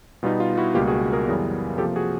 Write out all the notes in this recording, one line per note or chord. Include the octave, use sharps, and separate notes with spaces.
B2 G3 B3 D#4 F4
F4
E4 F#4
C#2 B2 G3 A#3 F4 G4
F#4 G#4
G#4 A#4
F#2 C#3 E3 G3 B3
C3 F3 A#3 G4 A4
F#4 G#4